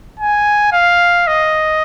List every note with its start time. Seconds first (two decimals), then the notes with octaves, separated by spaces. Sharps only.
0.20 G#5
0.73 F5
1.27 D#5